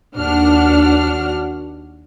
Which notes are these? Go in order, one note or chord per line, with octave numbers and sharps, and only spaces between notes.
D#2 D4 F#4 F#5 F6